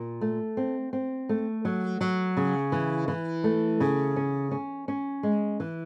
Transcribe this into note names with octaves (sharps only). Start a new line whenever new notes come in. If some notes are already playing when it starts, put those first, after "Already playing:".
Already playing: A#2
A3
C4
C4
A3
F#3
F#3
C#3
E3
E3
A3
C#3
C#4
C#4
C#4
G#3
E3